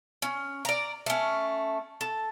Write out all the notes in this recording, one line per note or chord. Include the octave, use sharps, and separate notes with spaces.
C#4
D5 A#5
A3 C#4
A4